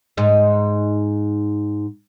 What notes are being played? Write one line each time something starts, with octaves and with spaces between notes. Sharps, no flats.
G#2 D#4